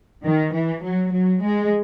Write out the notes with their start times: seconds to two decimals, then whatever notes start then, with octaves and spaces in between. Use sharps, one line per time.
0.25 D#3
0.54 E3
0.83 F#3
1.12 F#3
1.42 G#3